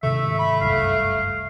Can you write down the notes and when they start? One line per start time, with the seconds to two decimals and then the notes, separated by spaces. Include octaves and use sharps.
0.03 G#2 C3 D#3 A3 E5
0.39 B5
0.61 F#1 C2 G2 F5